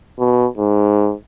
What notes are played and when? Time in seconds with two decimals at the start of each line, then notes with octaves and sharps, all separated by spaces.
0.19 B2
0.58 G#2